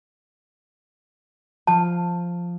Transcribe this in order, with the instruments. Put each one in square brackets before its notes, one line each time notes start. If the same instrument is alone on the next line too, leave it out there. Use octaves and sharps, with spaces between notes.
[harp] F3 F5 [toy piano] A5